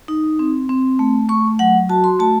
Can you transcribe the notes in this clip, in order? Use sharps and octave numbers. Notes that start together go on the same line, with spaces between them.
D#4
C4
C4
A3
A3 C#6
F#3 F#5
F#4 A5
C6
A3 A5